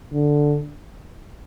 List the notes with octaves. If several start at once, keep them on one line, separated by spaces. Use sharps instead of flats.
D3